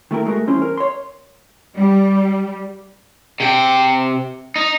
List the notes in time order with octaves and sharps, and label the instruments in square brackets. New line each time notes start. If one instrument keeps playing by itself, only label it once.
[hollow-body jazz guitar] D#3 A3 E4 A#4
G#3 A3 F#4 A#4
E2 G3 C#4 E4 C5 C6
A#4
C#5 C6
[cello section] G3
[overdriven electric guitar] C3 G5
D#4